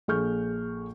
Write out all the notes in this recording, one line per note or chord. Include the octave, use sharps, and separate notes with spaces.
A#1 G#4 A4 C#6 F6 G6